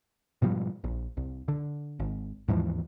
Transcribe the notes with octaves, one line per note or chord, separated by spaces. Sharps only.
G#2 B2 F3 G3
A#1
C2
D3
G#1
D#2 G#2 E3 F3